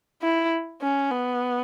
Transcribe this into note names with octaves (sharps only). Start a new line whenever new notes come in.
E4
C#4
B3